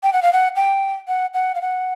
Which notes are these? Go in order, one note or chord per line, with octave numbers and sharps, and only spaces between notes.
G5
F#5
F5
F#5
G5
F#5
F#5
F5
F#5